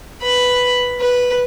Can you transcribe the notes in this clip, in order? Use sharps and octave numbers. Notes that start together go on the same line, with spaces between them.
B4 B5
B4